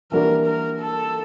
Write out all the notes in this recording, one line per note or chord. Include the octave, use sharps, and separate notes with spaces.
E3 G3 A#3 D4 F#4 A#4
A#4
A4